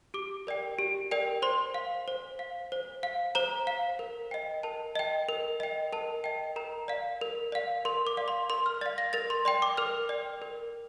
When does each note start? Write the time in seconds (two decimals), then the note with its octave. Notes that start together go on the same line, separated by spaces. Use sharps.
0.14 G4 D6
0.47 A#4 D5 G5
0.79 G4
1.11 A#4 D5 G5
1.42 C5 C6
1.74 F5
2.08 C5
2.39 F5
2.72 C5
3.03 F5
3.35 C5 A#5
3.67 F5
3.99 A#4
4.31 D#5 G5
4.63 A#4 A5
4.96 D#5 G5
5.29 A#4
5.60 D#5 G5
5.93 A#4 A5
6.24 D#5 G5
6.56 A#4 A#5
6.88 D5 F5
7.21 A#4
7.52 D5 F5
7.85 A#4 C6
8.07 D6
8.17 D5 F5
8.28 C6
8.50 A#4 C6
8.66 F6
8.81 D5 F5 A6
8.98 A#6
9.13 A#4 A6
9.30 C6
9.45 D5 G5 C6
9.62 D6
9.77 A#4 F6
10.09 D5 G5
10.42 A#4